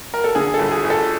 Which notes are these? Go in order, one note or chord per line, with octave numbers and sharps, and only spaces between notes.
A#4
A4
D3 G#4
A4
G1
G#4
G1
A4